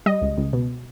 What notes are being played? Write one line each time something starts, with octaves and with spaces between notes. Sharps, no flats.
G3 D#5
C#2
C#2
B2